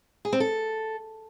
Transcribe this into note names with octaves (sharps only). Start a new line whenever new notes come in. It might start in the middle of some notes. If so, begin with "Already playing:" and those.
G#4
C4
A4